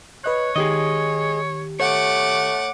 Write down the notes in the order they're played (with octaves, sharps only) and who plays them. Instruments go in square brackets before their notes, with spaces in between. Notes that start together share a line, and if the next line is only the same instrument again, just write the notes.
[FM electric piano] B4 D#5 F#6 [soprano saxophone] C#5
[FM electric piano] D#3 G4 [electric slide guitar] G#4 D#5
[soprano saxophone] A3 [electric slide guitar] C#5 [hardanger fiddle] F#5 D6